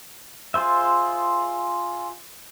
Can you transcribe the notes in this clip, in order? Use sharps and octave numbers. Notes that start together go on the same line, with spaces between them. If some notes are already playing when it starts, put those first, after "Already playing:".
F4 G#4 C5 E5